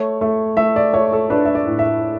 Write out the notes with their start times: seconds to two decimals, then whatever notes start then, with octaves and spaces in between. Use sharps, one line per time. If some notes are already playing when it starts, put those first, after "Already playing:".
Already playing: A3 C#5
0.21 A3
0.57 A3 E5
0.76 D5
0.93 A3 C#5
1.13 A4
1.30 D4 B4
1.45 E5
1.55 D5
1.67 A2
1.79 E5